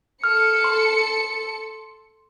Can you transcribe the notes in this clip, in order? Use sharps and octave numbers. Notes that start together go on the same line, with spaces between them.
A4 F6 C#7
C6